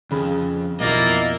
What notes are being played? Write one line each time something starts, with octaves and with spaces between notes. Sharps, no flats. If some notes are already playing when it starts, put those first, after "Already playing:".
F2 C#3 G#4 B5
B1 F2 A#3 E4 D5 D#5